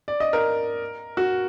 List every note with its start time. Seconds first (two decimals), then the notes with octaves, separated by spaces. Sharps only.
0.08 D5
0.20 D#5
0.33 A#4
1.17 F#4